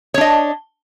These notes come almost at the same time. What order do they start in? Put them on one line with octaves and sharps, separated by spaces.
C#5 D4 D#5